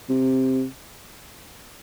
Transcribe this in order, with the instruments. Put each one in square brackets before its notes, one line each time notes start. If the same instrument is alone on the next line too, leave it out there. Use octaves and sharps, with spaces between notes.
[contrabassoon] C3